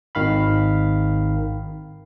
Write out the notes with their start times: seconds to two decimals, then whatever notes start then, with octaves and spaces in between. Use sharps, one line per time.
0.15 G#1 D#3 F5 B5